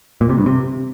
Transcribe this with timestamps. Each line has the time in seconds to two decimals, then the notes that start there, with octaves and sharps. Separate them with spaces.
0.21 A#2
0.29 C3
0.38 G2
0.46 C3